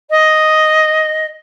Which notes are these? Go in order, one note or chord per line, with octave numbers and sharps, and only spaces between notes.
D#5